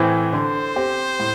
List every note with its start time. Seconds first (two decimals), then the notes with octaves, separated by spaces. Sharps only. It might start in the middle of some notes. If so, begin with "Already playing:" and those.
Already playing: A2 E3 C4
0.33 D3 C5
0.76 C4 G4
1.20 A2